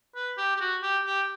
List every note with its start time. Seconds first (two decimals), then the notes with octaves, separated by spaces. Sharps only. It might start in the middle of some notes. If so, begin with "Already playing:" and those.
0.16 B4
0.38 G4
0.56 G4
0.60 F#4
0.83 G4
1.05 G4